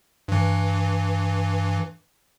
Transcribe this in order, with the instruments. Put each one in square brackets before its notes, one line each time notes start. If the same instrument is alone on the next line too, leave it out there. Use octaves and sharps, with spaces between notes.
[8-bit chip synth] G2 E3